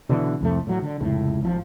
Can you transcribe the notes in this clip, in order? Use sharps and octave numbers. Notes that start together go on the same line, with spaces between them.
B2 D3 E3
C2 F2 A3
A2 F#3
D3
F1 C#2 A2
G#1 F3